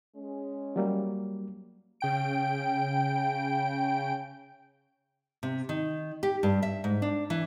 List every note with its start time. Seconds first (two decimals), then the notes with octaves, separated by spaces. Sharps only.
0.16 G#3 C#4
0.76 F#3 G3 A#3
2.01 C#3 G5 D7
5.43 C3
5.69 D#3
6.23 G4
6.43 G2
6.63 E5
6.84 G#2
7.02 D4
7.30 E3